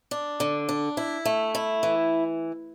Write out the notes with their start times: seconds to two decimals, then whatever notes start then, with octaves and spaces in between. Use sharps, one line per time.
0.11 D4
0.40 D3
0.69 D4
0.97 E4
1.25 A3
1.55 E4
1.83 E3